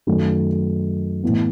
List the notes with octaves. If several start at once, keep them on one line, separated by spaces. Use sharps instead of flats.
F#2 D#3 F#3 A3
A2 E3 B3